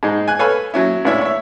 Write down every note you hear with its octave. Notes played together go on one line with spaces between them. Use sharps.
G#2 G#3 D#4
G#5 F#6
A4 B4 C#5 F5 G#5 B5
F#3 C#4 E4
C#2 A2 D4 E4 C#5 E5
C#5 E5